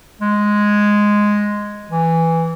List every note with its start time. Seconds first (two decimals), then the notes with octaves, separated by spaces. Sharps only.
0.21 G#3
1.90 E3